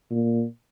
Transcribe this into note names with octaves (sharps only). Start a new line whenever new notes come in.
A#2